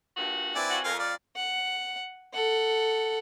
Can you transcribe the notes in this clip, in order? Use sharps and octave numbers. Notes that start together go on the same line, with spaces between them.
G2 A#2 F#4
C4 E4 B4 D5 G#5
F4 F#4
F2 A#4 F5
D5 F5
F#5
A4 F#5